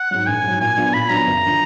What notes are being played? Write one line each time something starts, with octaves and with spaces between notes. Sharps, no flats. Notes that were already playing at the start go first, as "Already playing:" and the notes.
Already playing: F#5
G#2 F#3
A#1 G#5
G#2 F#3
A#2 G#5
F#3 B3 D4 F4
A#2 B5
F#3 B3 D4 F4 A#5
F#1
D3 F3